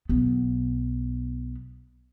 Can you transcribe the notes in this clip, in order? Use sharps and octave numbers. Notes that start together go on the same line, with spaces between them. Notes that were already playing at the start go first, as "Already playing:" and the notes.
B1 B3